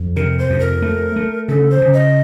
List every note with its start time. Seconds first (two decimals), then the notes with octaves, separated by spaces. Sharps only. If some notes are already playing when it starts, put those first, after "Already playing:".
Already playing: F2
0.16 C3 A#4
0.39 C5
0.50 F2
0.60 A#4
0.82 A3
1.16 A3
1.48 C#3 A4
1.71 C5
1.82 C#3
1.94 D#5